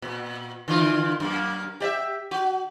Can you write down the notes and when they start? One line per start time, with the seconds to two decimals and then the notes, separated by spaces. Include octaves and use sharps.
0.02 A#2
0.68 D3 E3 F4
1.20 F#2 A#3
1.80 G4 D5 E5
2.31 F#4